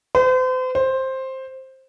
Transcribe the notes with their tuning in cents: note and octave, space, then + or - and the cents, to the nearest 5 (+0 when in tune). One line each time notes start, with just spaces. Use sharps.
C5 -40
C5 +10